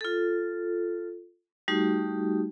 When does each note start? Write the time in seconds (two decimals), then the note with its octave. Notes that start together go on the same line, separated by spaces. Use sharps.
0.01 F4 A4
1.68 G3 A3 D#4 F#4 G4